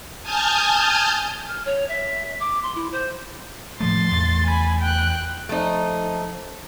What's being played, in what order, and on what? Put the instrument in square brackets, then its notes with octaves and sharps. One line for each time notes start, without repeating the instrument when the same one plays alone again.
[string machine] G#5 A5 D#6 F6 G6 G#6
[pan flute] F6
C#5
E5
D6
C6
E4
C5
[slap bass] A2 F3 A3 [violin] C6 A6
[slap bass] E2 A3
[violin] G#5 B5
G5 F#6
[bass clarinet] F3 [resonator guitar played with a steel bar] A3 D#4